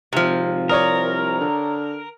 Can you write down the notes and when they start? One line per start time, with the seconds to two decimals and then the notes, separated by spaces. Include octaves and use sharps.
0.13 G#1 C3 F3
0.69 C2 A#4 C#5 D5 D#6
1.40 D3